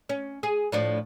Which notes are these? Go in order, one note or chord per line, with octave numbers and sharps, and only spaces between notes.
C#4
G#4
A2 F3 D4